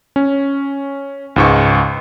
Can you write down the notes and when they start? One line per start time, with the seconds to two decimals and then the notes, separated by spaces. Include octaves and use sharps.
0.16 C#4
1.36 C#2 G#2 C#6